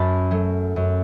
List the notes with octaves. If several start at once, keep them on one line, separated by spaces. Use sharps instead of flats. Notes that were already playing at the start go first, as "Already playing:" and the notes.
Already playing: F#2 A5 B5
F#3 A3
F#2